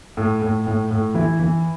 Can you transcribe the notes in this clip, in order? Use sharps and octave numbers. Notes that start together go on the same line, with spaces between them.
A2
A2
A2
A2
E3 E4
E3